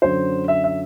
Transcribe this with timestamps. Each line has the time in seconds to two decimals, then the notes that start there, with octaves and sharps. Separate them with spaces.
0.02 F#2 D3 F#3 C5
0.48 E5
0.64 E5